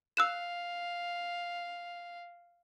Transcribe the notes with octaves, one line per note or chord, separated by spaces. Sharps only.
F5 E6 F#6 E7